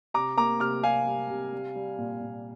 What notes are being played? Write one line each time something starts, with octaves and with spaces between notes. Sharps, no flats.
C3 A#5 D6
A#3 A#5 D6
C3 D6 F6
C3 F5 G#5
G3
C3
G3
G3
A#2
A#2